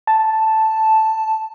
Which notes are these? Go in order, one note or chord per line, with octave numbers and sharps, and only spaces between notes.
A5